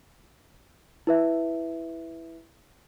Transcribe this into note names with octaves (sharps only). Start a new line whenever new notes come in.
E4 B4 E5